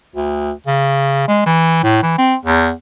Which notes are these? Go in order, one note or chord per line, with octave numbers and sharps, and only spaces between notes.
D2
C#3
G#3
E3
A2
E3
C4
E2